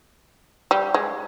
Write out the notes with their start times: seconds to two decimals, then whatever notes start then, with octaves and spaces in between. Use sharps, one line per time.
0.71 G3
0.94 G#3